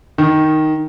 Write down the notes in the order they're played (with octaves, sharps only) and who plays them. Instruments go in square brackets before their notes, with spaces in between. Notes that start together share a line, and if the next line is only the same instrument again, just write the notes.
[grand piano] D#3